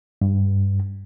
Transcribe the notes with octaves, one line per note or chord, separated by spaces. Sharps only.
G2